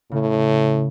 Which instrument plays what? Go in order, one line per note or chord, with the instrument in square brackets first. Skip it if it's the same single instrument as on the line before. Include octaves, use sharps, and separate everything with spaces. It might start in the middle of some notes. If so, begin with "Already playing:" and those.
[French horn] A2 [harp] C#3